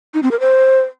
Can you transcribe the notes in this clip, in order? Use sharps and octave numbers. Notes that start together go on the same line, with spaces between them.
D#4
C4
A#4
C5